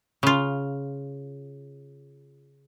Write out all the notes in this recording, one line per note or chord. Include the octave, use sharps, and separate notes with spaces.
C#3 F4